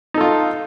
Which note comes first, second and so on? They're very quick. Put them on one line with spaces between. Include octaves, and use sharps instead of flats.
D#4 A4 F4